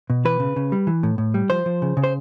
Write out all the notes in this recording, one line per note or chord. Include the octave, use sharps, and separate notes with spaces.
B2
E3 B4
C#3
C#3
G3
E3
A2
A2
G3
F3 C5
F3
C#3
C#3
C5